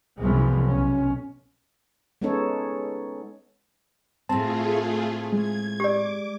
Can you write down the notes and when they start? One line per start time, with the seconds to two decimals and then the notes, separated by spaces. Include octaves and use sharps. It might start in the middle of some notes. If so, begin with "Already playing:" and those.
0.21 C2 F#2 E3 F3 G#3 B3
0.68 B1 C#4
2.21 G#3 B3 C#4 D#4 A4 C#5
4.29 A2 A3 C4 F4 G#4 A5
5.32 G#3 G#6
5.80 G4 D5 D6